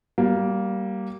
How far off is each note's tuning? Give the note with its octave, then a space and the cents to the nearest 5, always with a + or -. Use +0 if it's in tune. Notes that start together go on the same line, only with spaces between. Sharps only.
G3 -20 A#3 +0